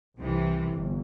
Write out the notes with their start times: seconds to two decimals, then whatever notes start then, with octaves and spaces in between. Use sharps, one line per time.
0.18 C2 C3 E3
0.72 G1